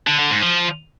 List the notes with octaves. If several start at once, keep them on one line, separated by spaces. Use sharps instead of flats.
D3
D3
G#2
F3